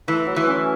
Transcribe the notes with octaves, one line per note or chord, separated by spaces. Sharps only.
E3 A3
F#3
E3
C#4